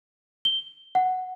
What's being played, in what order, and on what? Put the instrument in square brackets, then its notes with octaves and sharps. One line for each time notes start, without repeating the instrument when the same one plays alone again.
[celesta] G7
F#5